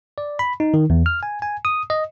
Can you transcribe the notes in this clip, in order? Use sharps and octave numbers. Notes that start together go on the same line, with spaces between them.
D5
B5
D#4
D#3
E2
F6
G#5
G#5
D#6
D#5